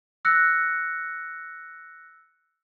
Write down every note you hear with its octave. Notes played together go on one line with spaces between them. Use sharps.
E6 F#6 A#6 C#7